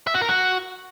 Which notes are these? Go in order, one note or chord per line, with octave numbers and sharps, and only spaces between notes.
E5
F#4
A#4
F#4